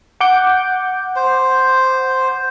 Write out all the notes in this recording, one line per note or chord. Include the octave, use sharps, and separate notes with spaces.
F#5 D6 G6
C5